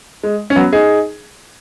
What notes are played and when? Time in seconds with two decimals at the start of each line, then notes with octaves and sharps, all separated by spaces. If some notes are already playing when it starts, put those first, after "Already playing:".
0.24 G#3
0.50 C#4
0.56 F#3 B3
0.73 D#4 G#4